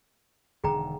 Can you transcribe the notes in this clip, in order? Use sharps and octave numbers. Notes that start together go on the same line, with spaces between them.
E1 D3 D#3 G#4 G5 A#5